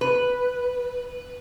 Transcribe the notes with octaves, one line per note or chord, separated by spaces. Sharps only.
B4